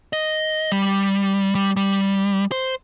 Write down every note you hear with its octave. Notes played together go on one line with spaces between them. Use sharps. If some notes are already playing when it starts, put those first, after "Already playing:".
D#5
G3
G3
G3
C5